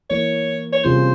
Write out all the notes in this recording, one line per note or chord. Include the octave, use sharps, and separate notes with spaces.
E3 A#3 E4 A#4 C#5
C#5
C3 G3 C#4 F4 G#4 C5